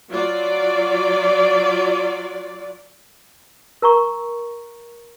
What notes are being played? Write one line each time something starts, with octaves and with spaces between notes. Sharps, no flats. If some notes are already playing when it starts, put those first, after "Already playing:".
F#3 F4 D5
A#4 A#5 C#6